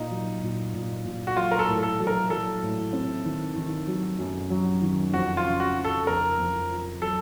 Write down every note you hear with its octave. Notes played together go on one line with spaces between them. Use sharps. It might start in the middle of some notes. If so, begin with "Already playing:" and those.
Already playing: A#2 D#4
F#3
A#2
A#2
A#2
F#4
F#3 F4
A#4
A4
A2
A4
F#3
A#4
F#3 A4
A2
C4
D#3
D#3
F#3
F#2
F#3
D#3
F2 F#4
F4
C#3
F#4
F3
A4
F2 A#4
F2
F3
F#3 A4